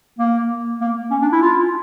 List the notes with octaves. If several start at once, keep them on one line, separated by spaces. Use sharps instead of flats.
A#3
A#3
C#4
D4
E4
F4